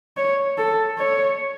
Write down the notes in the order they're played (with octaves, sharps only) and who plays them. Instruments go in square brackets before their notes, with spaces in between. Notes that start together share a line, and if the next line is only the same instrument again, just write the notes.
[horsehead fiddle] C#5
A4
C#5